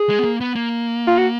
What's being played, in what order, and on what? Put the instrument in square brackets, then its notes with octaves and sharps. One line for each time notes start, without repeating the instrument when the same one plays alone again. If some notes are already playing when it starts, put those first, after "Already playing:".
Already playing: [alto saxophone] G#4
[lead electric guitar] G#3
B3
A#3
B3
A#3
[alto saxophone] F4
F#4